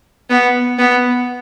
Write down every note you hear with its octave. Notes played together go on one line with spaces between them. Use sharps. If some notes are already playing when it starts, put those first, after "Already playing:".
B3
B3